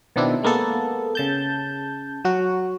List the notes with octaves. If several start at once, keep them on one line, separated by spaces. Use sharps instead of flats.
B2 D#3 C4 D4 E4
G#3 A#3 B3 A4
C#3 A5 G6
F#3 F#4